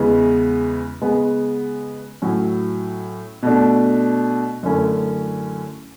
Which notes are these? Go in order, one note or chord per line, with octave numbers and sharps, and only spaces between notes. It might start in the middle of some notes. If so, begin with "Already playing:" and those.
Already playing: E2 C#3 G#3 B3
C#3 G#3 B3
A2 F#3 C#4
B2 A3 D4
F#2 D3 A3 C#4 E4